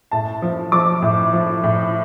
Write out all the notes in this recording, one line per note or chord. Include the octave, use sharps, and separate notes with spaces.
A2 A5
F3
F3 D6
A2
F3
A2